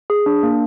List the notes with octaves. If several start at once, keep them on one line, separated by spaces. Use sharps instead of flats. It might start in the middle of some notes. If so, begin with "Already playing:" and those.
G#4
D4
A#3